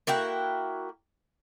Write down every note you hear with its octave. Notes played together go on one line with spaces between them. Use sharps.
A#3 E4 F#4 G5